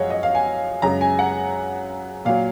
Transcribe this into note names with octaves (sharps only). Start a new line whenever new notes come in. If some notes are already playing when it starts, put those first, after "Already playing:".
Already playing: F#2 F3 G#3 C#5 D#5 F5 F#5
D#5
F5
G#5
F#2 C#3 G#3 A#5
G#5
F#5
A#2 F#3 F5